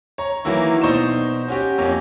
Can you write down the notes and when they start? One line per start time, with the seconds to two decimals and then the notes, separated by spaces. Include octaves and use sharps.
0.18 C#5 A#5
0.45 D#3 E3 F#3 A#3 E4
0.82 B2 D#4 C5 D5 C#6 E7
1.48 C#4 F#4 G4
1.78 F2 A#3 C#4 G4